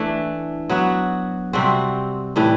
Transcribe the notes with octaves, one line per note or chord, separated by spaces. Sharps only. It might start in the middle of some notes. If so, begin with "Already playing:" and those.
Already playing: E3 A3 D4
F#3 B3 F#4
C3 G3 C4 F#4
A2 E3 G3